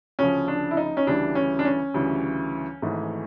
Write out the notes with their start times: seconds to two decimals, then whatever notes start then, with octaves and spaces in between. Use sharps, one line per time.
0.19 D2 C#3 F3 C#4
0.48 D4
0.71 E4
0.77 D#4
0.97 C#4
1.07 D2 C#3 E3 G3 D4
1.35 C#4
1.59 D4
1.65 C#4
1.94 D2 C#3 E3 G3
2.82 G#1 G#2 E3 A3